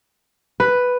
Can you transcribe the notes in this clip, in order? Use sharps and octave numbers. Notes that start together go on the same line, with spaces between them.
B4